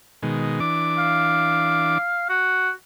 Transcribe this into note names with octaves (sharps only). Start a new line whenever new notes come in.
B2 D#3 G#3
E3 D4 D6
F5
F#4